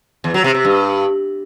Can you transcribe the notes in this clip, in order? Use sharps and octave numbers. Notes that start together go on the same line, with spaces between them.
E2
F#3
C3
C3
G2